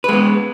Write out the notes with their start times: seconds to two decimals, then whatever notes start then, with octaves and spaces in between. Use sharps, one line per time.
0.04 B4
0.09 G#3
0.13 B3